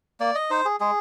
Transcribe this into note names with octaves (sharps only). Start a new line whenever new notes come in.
A#3 D5
D#5
D#4 C5
G#4
G#3 G#4